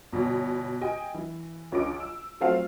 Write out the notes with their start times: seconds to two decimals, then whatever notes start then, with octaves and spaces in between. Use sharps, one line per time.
0.12 G1 B2 C#5
0.81 G4 D#5 G5 G#5
1.14 E3
1.72 C#2 C#4 D4 D#5 D6 D7
2.00 E6
2.41 F3 F#3 A3 C4 A4 F5